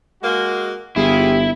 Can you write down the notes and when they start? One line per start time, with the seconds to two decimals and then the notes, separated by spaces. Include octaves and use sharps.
0.22 G#3 A#3 F#4
0.96 G1 E4 F4 G4 G#4